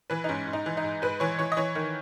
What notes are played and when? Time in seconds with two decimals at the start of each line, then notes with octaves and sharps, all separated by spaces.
0.10 E3 B4
0.24 D#4
0.29 G#2 C#4
0.47 G#2
0.53 D#4
0.66 E3
0.77 D#4
0.84 G#2
1.02 G#2 B4
1.20 E3 C#5
1.39 E3 C#5
1.52 D#5
1.57 E3 C#5
1.75 D#3